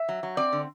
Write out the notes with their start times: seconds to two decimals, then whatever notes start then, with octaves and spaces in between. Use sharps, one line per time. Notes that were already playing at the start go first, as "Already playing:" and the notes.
Already playing: E5
0.09 F#3
0.23 F#3
0.37 C4 D5
0.52 D3